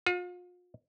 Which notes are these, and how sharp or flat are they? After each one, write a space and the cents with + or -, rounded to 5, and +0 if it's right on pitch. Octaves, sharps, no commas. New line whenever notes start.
F4 +40